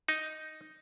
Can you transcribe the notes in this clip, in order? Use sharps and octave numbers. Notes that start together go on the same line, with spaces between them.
D#4